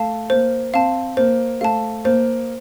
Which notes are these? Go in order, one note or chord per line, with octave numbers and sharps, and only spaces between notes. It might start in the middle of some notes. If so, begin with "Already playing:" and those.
Already playing: A3 F5 A5
A#3 C5
C4 F5 A5
A#3 C5
A3 F5 A5
A#3 C5